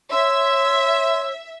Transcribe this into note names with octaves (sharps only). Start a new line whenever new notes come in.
C#5 E5 C6 E6